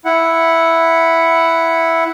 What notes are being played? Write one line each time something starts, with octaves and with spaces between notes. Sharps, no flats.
E4 F#5